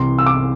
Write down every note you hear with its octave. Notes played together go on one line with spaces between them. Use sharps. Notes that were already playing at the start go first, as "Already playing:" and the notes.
Already playing: C2 C3 E3 C6
E6
D6